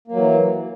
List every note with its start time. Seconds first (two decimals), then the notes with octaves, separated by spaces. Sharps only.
0.08 A#3
0.12 F#3
0.16 E3